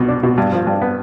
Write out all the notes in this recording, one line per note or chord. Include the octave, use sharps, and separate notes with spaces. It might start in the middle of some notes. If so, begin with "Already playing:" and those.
Already playing: C2 B2
D4
B2
G2
F3
G2
B3